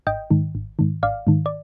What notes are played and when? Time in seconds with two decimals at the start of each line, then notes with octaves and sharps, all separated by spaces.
0.07 G#1 D#5 G5
0.31 G#2 D#3
0.55 G#1
0.79 G#2 D#3
1.03 G#1 D5 F5
1.27 G#2 D#3
1.46 D5